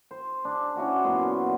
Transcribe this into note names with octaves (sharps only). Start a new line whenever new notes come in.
C5
D4 G#4
C#4 E4 F#4 D5
F#2 A#2 B3 C6